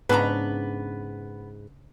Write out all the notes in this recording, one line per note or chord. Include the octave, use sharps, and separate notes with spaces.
G#2 C#3 B3 D4 B4 G#5 A#5